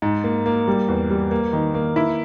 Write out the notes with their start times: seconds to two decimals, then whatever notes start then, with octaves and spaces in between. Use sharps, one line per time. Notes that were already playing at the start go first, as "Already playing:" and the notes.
0.02 G#2
0.24 A#3
0.46 A#3
0.68 G3
0.88 E2
1.11 G3
1.31 A#3
1.53 D#3
1.74 A#3
1.96 E4